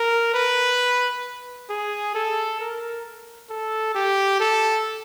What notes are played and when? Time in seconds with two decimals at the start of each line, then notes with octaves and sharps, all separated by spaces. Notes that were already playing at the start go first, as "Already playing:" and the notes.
Already playing: A#4
0.34 B4
1.70 G#4
2.15 A4
2.60 A#4
3.50 A4
3.95 G4
4.40 A4